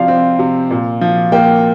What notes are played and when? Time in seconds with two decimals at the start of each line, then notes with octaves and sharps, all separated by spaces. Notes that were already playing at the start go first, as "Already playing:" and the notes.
Already playing: C3 F3 D5 F5 C6
0.08 C4
0.39 C3
0.71 A#2
1.01 F3
1.32 A#3 G5